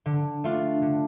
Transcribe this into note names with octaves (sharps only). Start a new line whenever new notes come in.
D3
A3 D4 F4
D3